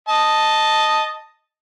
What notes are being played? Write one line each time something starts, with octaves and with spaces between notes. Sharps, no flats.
D#5 A5